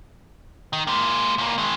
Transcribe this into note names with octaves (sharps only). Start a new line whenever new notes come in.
D#3
G#3 A#3
C#2 A#3
D#3 G#3